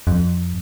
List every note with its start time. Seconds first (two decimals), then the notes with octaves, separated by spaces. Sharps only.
0.07 F2